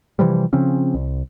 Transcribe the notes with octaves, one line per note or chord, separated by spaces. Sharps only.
C3 E3 F3 G3
C#3 F3 C4 C#4
C2